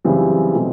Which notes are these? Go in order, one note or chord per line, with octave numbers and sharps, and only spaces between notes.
F#2 C#3 E3 G3 C4
B2 F#3 A3 C4